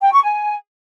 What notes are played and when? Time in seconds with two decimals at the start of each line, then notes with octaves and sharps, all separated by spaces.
0.01 G5
0.12 C#6
0.24 G#5